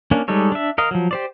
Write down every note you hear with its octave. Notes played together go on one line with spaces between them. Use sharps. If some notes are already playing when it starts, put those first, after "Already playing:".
A#3 C#4 D4
G3 G#3 D#4 A4 C#5
D4 E5
A#4 D#5 F5
F3 F#3
G4 C5 D5